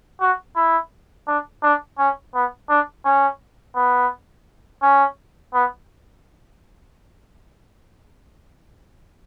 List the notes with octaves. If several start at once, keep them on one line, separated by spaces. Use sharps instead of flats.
F#4
E4
D4
D4
C#4
B3
D4
C#4
B3
C#4
B3